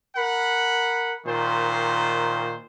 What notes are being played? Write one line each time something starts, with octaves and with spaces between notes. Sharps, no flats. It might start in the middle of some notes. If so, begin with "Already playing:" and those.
A#4 F#5 B5
A#2 D#3 C5